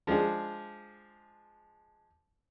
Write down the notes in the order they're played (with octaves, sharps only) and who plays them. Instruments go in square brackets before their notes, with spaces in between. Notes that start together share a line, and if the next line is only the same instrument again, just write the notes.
[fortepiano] F3 G#3 D4 G#4